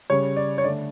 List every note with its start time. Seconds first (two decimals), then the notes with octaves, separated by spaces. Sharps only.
0.10 C#3 G3 C#5
0.37 D5
0.58 C#5
0.64 D3 A3 D5